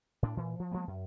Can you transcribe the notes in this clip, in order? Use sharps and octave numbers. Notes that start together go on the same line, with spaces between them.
A2 D4
A#2 E3
F3
F3 G#3 A#3 B3
F#2